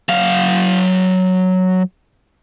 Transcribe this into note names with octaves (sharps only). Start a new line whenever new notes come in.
F#3 F5